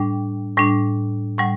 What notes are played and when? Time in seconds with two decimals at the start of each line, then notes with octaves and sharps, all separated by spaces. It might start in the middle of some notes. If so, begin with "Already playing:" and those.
Already playing: A2 G3 D4 G5
0.57 A2 G3 D4
1.38 A2 G3 F#5